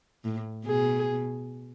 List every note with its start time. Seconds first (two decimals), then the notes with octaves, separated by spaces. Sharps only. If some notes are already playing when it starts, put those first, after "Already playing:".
0.24 A2
0.66 B2 G#4